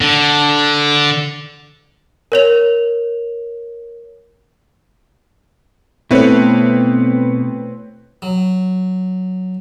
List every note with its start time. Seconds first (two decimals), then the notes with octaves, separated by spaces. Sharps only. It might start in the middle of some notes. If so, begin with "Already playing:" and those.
0.01 D3
2.32 A#4 C#5 F7
6.11 B2 A3 B3 C4 E4 B4 C#5
8.22 F#3